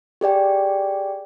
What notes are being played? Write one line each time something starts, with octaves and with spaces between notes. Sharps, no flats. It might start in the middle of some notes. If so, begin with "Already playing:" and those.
G4 G#4 D5 G5